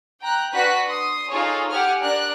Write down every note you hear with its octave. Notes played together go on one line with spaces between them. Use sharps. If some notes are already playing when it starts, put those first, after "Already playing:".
G5 A#5 F#6
D4 F#4 B4 F#6 B6
C6 D#6
D#4 F4 G#4 A4 C#5
G4 F#5 G#5 F6
D4 A#4 D5 F#6